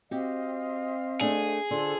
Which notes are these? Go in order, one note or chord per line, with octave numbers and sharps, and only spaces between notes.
C4 F#4 G4 C5 D#5 F5
A3 D4 G#4
D3 F4 A4 C5 C6